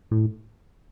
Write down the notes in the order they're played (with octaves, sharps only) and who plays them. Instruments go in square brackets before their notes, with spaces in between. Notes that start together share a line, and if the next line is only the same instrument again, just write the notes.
[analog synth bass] A2